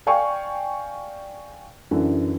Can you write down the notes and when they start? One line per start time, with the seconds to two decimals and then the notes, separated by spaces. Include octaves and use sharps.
0.07 D5 F5 G5 G#5 C#6
1.91 F#2 D3 E3